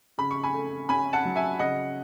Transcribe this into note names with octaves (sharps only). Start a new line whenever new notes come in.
C#3 B5
C#6
G#5 B5
A3
C#4 G#5 B5
F#5 A5
F#3
E5 G#5
C#3 D#5 F#5